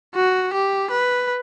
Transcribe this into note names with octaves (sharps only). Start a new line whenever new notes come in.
F#4
G4
B4